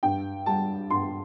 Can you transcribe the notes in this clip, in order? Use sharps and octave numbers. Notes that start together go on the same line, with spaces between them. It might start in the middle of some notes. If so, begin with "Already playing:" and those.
G2 G5
G3 A5
G2 C6